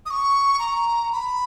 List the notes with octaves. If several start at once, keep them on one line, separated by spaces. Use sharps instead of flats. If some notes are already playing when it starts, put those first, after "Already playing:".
D#6
C#6
A#5
B5